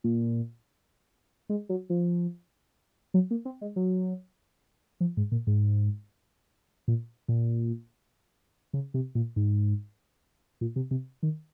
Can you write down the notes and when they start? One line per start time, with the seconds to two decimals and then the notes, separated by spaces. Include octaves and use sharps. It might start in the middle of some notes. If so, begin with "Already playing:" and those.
0.04 A#2
1.49 G#3
1.69 F#3
1.90 F3
3.14 F#3
3.31 A#3
3.45 C4
3.61 G#3
3.76 F#3
5.00 F3
5.17 G#2
5.32 A#2
5.47 G#2
6.88 A#2
7.28 A#2
8.73 C#3
8.94 C3
9.15 A#2
9.36 G#2
10.61 A#2
10.76 C3
10.91 C3
11.23 D#3